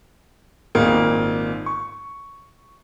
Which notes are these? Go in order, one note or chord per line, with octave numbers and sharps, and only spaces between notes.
G#1 A#2 A#3 D#4
C#6